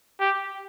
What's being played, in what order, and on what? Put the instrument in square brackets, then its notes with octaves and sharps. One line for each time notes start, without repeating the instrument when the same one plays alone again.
[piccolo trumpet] G4